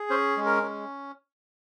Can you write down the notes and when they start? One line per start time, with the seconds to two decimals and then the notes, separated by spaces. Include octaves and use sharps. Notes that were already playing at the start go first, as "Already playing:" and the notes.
Already playing: G#4
0.10 C#4 C5
0.37 G#3
0.46 A#4
0.63 C#4